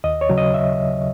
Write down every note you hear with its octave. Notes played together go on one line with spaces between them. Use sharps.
D#2 D#5
C#5
C#3 F#3
D#5
E5